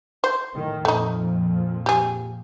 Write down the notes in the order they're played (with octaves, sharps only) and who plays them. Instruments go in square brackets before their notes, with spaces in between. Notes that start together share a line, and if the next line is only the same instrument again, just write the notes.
[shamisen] C5
[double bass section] A2 D#3
[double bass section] F2 A#2 F3 [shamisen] A3 D#4
[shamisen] G4 G#4